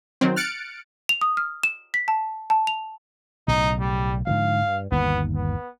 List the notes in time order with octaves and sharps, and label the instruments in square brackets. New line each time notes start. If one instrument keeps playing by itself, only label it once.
[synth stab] D#3 F#3 C4
F6 F#6 A6 C#7 D7
[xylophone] F7
D#6
F6
E7
B6
A5
A5
F7
[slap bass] B1 A2 C#3 [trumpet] D#4
[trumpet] G3
[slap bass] G#2 D3 F3 [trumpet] F5
[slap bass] G2
[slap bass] G1 D#2 [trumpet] B3
[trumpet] B3